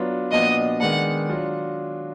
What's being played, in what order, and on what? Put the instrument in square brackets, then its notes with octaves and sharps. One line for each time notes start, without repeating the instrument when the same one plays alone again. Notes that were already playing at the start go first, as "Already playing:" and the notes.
Already playing: [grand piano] F#3 B3 D4 F4
[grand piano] A#2 F3 B3 D4 F#4 [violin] D#5
[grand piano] D#3 G#3 B3 D4 [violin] F#5
[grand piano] F#3 D4 F4